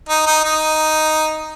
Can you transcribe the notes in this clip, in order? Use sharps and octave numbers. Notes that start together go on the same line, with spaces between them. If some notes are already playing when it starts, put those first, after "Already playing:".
D#4
D#4
D#4